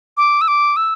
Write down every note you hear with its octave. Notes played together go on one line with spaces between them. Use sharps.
D6
E6
D6
E6